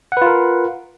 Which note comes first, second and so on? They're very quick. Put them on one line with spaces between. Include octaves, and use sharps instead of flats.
F#5 B4 F4 A#4